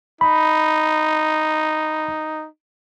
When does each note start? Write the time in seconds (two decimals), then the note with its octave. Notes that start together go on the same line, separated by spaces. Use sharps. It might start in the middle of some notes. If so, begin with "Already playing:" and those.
0.21 D#4 B5